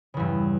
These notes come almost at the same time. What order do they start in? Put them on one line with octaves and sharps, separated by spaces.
C#3 E2 G2